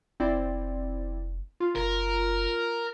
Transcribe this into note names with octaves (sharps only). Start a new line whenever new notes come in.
F1 C4 E4 D5
F4
F#1 A#4